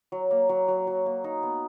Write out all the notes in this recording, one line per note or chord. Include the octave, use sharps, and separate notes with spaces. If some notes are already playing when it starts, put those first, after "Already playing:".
F#3
A#3
F#3
F#3
F#3
A#3
D#4
B3